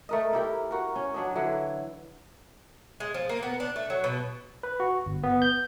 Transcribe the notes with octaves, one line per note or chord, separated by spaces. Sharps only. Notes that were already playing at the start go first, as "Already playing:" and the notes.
A3 A#4 D#5
E4 G4 A#4
F#4 A#4
C#4
F#3 D4 D#5
D3 E3 F#3
G#3
F3
A#3
B3
D4
A3
F#3
B2
B4
F#4
G1
B3
G6